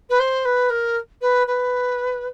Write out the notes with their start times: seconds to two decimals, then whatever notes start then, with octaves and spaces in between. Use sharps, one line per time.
0.09 B4
0.19 C5
0.45 B4
0.70 A#4
1.21 B4
1.47 B4